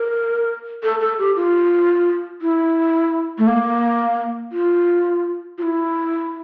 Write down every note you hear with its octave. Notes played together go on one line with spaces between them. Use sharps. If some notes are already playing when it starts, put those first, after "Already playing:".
Already playing: A#4
A4
A4
G4
F4
E4
A3
A#3
F4
F4
E4